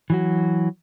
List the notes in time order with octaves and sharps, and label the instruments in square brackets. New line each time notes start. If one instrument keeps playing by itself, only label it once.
[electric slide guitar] E3 F#3 F#4